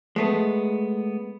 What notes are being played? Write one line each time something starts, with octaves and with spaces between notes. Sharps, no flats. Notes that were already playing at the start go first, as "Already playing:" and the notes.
G#3 A3 B3